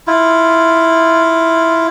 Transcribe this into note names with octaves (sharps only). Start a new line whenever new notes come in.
E4 F4